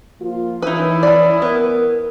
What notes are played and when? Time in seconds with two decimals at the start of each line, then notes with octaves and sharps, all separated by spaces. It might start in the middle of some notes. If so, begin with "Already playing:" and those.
0.20 F3 A#3 F4
0.62 E3 C#4 D#4 E4 B4 D#6
1.03 D5 B5
1.42 B3 A#4